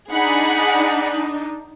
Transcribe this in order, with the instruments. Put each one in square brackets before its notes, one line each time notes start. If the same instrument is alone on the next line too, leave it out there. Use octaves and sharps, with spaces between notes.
[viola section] D4 D#4 [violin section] G#4 F#5 B5